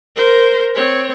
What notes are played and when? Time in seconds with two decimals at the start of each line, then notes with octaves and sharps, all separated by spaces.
0.16 A#4 C5
0.75 C4 C#5